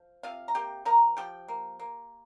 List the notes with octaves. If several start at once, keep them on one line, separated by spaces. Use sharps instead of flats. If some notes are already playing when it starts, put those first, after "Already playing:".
Already playing: F3
C3 F4 F5
A#5
A#3 G4 G5
F3 A#4 A#5
F3 G4 G5
A#3
A#3